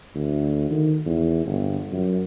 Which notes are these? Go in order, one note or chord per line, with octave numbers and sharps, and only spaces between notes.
D2
D#3
E2
G1
F#2